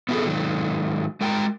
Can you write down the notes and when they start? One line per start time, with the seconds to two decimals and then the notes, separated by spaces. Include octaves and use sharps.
0.09 B3 C#4 E4 F#4 G#4 A4
0.25 G#2 D#3 F#3
1.21 G#3 A#4 G5 A5 A#5